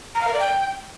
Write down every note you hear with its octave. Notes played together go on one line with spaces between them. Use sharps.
A#5
F5
A#4
D5
G5